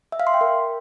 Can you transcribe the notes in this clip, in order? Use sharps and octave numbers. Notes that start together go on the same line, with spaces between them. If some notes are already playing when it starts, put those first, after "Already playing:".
E5
F5
C6
G5
A#4